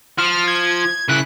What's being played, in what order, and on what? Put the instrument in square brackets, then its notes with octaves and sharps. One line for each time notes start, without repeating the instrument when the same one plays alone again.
[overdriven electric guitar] F3 [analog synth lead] F6
[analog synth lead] G#6
[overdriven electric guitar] C#3 E4 [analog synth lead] F#6